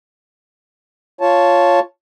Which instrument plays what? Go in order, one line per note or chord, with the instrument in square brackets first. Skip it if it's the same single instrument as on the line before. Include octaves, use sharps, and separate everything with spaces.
[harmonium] F4 C#5 A5